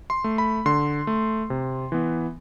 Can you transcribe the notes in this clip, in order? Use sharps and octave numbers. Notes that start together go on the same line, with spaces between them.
C6
A3
B5
D3 C6
A3
C3
E3 B3